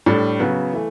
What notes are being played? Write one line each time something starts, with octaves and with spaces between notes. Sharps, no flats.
A2 G3 D4
C#3 F#3 B3
E3 A3